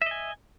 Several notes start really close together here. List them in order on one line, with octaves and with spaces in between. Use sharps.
E5 D#5 G#5